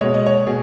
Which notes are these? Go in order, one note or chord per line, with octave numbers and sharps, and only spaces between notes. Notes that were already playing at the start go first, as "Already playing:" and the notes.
B2 G#3 C#5
D#5
C#5
B2 G#4